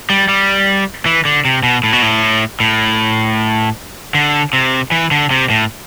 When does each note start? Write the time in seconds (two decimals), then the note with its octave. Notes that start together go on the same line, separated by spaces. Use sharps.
0.10 G3
0.29 G3
1.06 E3
1.25 D3
1.45 C3
1.63 B2
1.83 A2
1.93 B2
2.02 A2
2.60 A2
4.14 D3
4.53 C3
4.91 E3
5.11 D3
5.31 C3
5.50 A2